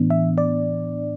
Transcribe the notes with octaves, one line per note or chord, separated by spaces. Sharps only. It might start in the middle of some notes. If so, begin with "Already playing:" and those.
Already playing: A2 E3 B3 D4
E5
D5